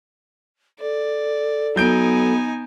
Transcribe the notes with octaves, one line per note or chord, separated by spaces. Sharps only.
A4 D5
F#3 B3 D#4 G#5 G6 D7